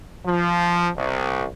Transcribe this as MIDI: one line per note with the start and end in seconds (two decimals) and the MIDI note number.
0.25 0.89 53
0.97 1.46 36